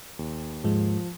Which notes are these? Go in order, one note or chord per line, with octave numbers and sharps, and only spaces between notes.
D#2
G#2 F3 G#3